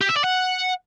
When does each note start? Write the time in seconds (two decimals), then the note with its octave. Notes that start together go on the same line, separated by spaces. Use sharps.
0.01 G4
0.09 E5
0.17 D5
0.24 F#5